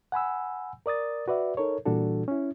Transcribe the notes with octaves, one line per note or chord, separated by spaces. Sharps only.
F#5 G#5 B5 E6
A#4 D5 D#6 A6
F#4 B4 D5 E5
D#4 A4 A#4 C#5
A#2 E3 G3 D4 F#4 A4
C#4 E4